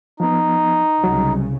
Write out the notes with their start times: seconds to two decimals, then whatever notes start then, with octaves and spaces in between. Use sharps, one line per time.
0.20 F3 B3 D#4
1.04 C2 C#3 F#3